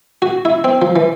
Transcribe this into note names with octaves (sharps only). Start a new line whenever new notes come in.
F#4
E4
C4
F3
E3